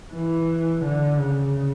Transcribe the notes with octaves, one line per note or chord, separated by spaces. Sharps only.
E3
D3
C#3